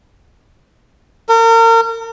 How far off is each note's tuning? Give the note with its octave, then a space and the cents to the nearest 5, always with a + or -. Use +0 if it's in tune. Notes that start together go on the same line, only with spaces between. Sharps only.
A#4 -35